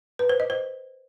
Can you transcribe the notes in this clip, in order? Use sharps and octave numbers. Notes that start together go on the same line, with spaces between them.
B4
C5
D#5
C5